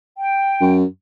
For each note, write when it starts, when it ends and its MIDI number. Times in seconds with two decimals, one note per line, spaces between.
0.16 0.74 79
0.61 0.84 42